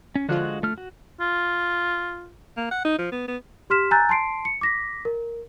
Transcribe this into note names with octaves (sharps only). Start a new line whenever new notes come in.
C#4
D3 F3 G#3 F4 F#4 F#6
A3 F6
F#4
F4
A#3
F#5
D#4
F3
B3
B3
G4 C6 F6 B6 E7
G#5 A#5 E6 F#6 G6 A6
A5 C6 C7 D7
C#7
D6 A#6 B6
A#4